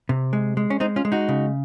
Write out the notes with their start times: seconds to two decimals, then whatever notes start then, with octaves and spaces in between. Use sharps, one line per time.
0.09 C3
0.33 G#3
0.57 G#3
0.70 C#4
0.80 G#3 C4 D#4
0.96 C#4 F4
1.05 G#3
1.12 D#4 F#4
1.28 C#3